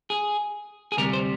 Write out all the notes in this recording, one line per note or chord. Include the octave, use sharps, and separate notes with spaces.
G#4
G#4
D2 C3 G3 A#4
C5